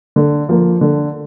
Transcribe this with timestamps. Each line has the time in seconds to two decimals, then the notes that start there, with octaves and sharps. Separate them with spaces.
0.16 D3
0.49 F3 A#3
0.81 D3